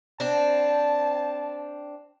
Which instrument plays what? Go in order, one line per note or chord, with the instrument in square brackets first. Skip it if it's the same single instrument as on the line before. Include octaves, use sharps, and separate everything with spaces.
[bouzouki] C4 D4 [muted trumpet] A5